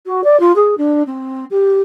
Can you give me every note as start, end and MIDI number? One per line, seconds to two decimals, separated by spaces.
0.06 0.20 66
0.23 0.39 74
0.39 0.54 65
0.55 0.77 68
0.77 1.02 62
1.06 1.44 60
1.50 1.81 67